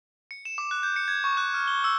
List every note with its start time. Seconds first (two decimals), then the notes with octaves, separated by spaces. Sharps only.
0.31 C#7
0.45 E7
0.58 D6
0.71 F#6
0.83 G6
0.96 C#7
1.08 G#6
1.24 C#6
1.37 F#6
1.54 F6
1.67 G7
1.84 E6